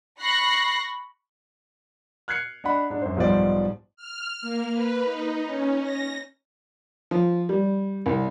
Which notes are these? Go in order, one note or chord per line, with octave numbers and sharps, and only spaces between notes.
B5 C#6 F#6 A#6 C7
F6 F#6 G#6 C7 C#7
D4 D#5 F#5 B5
G#2 D4
F#2 C5
B1 G#2 F3 G3 C5 D5
F6
A#3
B4
D#4
C#4
A#6
F3
G3
C2